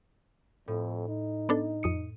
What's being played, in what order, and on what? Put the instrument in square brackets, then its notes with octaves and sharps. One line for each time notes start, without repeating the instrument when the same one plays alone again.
[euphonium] F2 [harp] A2
[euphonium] D#4
[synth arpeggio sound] B3 D4 A4
[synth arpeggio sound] F2 D#6 C#7 [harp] D#7